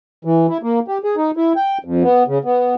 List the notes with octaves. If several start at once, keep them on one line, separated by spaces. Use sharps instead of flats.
E3
E4
A#3
G4
G#4
D#4
E4
G5
F2
B3
C#3
B3